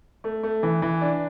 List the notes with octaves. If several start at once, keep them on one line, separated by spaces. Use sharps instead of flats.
A3
A3
E3
E3
D4